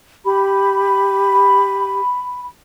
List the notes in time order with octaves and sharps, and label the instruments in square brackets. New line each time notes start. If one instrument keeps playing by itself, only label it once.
[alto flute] G4 [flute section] B5